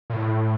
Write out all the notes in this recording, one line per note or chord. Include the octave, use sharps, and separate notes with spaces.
A#2
A2